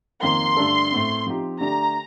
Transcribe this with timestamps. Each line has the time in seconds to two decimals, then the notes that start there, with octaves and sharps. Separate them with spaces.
0.23 F2 D#3 A#3 C6
0.57 G2 D3 A3 D4 A4
0.92 A2 A3 C4
1.27 F3 C4 D#4 G4
1.60 D3 A3 D4 G4 A#5